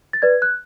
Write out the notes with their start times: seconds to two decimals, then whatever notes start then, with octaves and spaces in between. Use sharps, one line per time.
0.13 A6
0.22 B4 D5 G#6
0.42 F#6